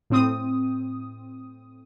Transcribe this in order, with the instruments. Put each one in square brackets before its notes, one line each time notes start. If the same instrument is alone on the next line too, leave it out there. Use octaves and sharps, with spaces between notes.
[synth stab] A2 C4 D#6